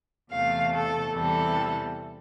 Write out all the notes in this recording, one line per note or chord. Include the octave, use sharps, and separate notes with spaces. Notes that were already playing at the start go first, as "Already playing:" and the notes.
E2 C3 E3 A3 F5
A4
E2 C3 E3 G3 A4